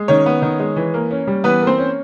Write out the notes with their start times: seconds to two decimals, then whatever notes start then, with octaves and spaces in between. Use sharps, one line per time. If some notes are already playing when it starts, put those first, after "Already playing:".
Already playing: G#3
0.08 D#3 C#4 C#5
0.26 B3
0.42 D#3
0.60 G#3
0.76 E3
0.94 A#3
1.11 C#4
1.27 G3
1.44 E3 B3 B4
1.61 A#3
1.67 C4 C5
1.78 C#4